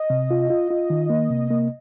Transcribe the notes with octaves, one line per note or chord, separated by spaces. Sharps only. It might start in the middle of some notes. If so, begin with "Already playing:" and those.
Already playing: D#5
C3
F4
F4
F4
D#3
A#3
C3
A#3